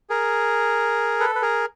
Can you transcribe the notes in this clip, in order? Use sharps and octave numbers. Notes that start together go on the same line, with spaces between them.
G#4 A#4
A4 B4
B4
G#4 A#4